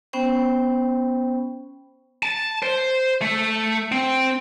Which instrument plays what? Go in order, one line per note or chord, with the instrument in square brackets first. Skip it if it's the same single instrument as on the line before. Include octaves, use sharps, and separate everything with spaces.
[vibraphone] B3 C#4 C5 G5
[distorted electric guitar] A5
C5
A3
C4